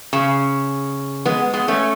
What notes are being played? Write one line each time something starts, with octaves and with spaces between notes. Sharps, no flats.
C#3
G#3 B3
G#3 B3
A3 C#4